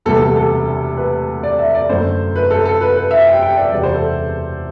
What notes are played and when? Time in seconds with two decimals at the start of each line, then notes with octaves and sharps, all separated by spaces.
0.05 E1 D2 C3 G3 B3 A4
0.22 A4
0.36 A4
0.97 B4
1.43 D5
1.59 E5
1.75 D5
1.89 F#2 D3 A3 C5
2.36 B4
2.51 A4
2.65 A4
2.81 B4
2.96 B4
3.11 E5
3.27 G5
3.42 G5
3.57 D5
3.72 E1 E2 C3 F#3 B3 D5
3.83 C5
3.95 A4